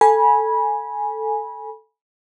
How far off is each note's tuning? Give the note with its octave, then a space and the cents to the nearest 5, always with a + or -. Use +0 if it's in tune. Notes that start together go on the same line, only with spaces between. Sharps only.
A4 +0 G#5 +0 B5 -25